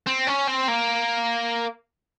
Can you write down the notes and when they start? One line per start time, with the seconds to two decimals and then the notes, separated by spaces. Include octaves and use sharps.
0.07 C4
0.27 C#4
0.48 C4
0.68 A#3